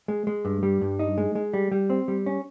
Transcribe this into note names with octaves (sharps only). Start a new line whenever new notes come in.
G#3
G#3
G2
G3
G2
D#4
G#3
G#3
G3
G3
C4
G3
C#4